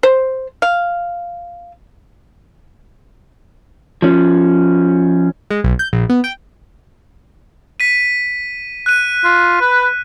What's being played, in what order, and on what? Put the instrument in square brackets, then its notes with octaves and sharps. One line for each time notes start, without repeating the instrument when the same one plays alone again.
[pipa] C5
F5
[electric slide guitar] F3 C#4
[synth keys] G#3
B1
G6
A#1
B3
G5
[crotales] B6 D#7
F#6 D#7
[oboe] F4
B4